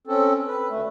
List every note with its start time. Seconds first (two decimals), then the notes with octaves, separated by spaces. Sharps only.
0.07 C4 C#4 A4
0.47 B4
0.69 D2 A3